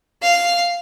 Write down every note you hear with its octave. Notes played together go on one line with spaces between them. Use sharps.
F5